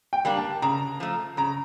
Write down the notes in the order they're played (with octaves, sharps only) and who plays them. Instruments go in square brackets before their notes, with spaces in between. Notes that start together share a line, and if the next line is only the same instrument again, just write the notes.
[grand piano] G5
[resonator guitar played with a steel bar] G3 A#3 D4
[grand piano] A5
[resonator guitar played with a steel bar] C#3 [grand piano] A#5
[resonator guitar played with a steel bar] F3 A3
[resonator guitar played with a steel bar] C#3 [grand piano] A#5